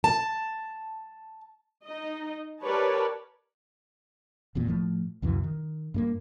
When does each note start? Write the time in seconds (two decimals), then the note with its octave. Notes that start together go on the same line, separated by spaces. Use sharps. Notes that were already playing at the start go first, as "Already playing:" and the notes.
0.04 A5
1.84 D#4 D#5
2.62 G4 A#4 B4 C#5 D5 A5
4.55 E1 E2 A#2 B3
4.67 A2 F3 G#3 A3
5.22 C#2 F#2 B2 E3
5.44 D#3
5.94 G2 G#3 A#3